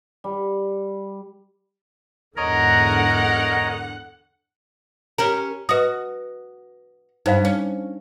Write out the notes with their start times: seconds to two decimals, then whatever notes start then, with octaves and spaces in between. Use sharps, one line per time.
0.24 G3
2.37 E2 G#2 D3 A#4 C#5 D#5 F#5 A#5
5.18 C#4 G4 A#4 A#5
5.69 F#4 B4 D#5 D#6
7.26 G2 D#4 C5 F5
7.45 C#4